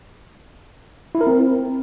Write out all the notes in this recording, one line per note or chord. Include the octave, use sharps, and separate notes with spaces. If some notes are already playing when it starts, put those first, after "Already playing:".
E4
A#4
C4